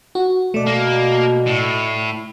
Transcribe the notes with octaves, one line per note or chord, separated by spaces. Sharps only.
F#4
B2 A3 D5
A#3
A2